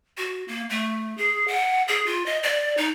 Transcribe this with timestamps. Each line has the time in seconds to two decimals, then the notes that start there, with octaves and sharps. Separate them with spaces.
0.18 F#4
0.48 A#3
0.70 A3
1.17 G#4
1.48 F#5
1.88 G#4
2.06 F4
2.26 D#5
2.43 D5
2.77 D#4